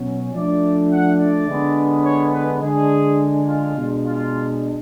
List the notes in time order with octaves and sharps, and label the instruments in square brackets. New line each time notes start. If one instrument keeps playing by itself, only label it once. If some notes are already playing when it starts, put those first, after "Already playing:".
Already playing: [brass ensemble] B2 F#3 C#4
F3 A3 D4 D5
F#5
D5
D3 G#3 B3 D4
C#5
B4
D3 G#3 D4 G#4
F4
B2 G#3 D4
F4